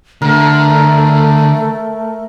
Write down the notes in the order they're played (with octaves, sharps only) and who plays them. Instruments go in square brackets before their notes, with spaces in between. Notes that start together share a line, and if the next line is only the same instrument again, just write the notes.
[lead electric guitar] D3 [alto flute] A3 [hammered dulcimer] A#4